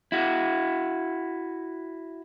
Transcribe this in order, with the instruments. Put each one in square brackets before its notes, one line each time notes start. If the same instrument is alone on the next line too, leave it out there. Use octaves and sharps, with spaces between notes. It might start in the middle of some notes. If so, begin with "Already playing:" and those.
[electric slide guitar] E4 F#4